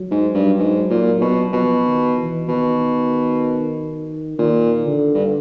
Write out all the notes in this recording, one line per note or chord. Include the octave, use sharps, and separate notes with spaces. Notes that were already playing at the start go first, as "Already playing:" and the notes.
Already playing: F#3
G#2
G2
G#2
A#2
B2
B2 F3
D#3
E3
B2 D#3
A#2 D#3
D3
G2